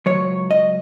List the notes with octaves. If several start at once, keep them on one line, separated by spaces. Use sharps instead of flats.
C#2 C3 F#3 C#5
D#5